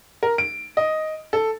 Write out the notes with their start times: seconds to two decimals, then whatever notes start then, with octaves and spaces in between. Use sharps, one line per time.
0.23 A#4
0.38 D7
0.77 D#5
1.33 A4